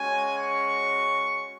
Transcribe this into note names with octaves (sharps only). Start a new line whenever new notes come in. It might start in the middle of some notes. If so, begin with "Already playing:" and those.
Already playing: G#3 C#4 F#4 G#5
C#6